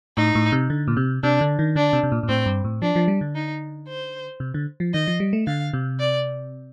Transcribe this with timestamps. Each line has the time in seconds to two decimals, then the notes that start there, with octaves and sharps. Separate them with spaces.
0.17 A2 D#4
0.35 A2
0.52 C3
0.70 D3
0.88 A#2
0.97 C3
1.23 C3 D4
1.41 D3
1.59 D#3
1.76 D3 D4
1.93 C3
2.03 C3
2.12 A#2
2.23 A#2
2.28 A2 C4
2.46 G2
2.64 A2
2.82 F3 D4
2.96 F3
3.08 G3
3.21 D3
3.35 D#4
3.88 C5
4.40 C3
4.54 D3
4.80 F3
4.94 D#3 D#5
5.08 F3
5.20 G3
5.33 A3
5.47 D3 F5
5.73 C3
6.00 D5